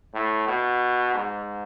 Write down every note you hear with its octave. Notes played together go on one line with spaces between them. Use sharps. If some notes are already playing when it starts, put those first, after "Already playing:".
A2
B2
G#2